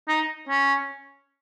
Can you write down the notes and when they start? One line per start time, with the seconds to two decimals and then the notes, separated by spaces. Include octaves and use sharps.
0.08 D#4
0.49 C#4